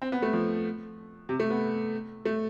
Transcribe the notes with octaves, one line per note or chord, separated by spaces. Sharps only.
C4
B3
A3
F3
C3
A3
B3
A3